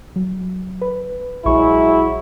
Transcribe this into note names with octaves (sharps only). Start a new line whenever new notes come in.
F#3
B4
A#1 F#3 G#3 E4 C#6